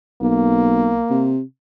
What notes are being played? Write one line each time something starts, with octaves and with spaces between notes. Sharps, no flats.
B1 A#3
C3